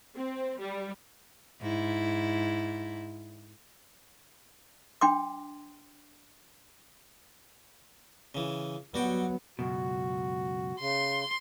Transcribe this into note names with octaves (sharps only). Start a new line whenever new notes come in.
C4
G3
G#2 E4
D4 G5 C6 D6
C#3 E3
F#3 G3 B3 F#4 G5
C#2 F#2 B2 F#4
C#3 C6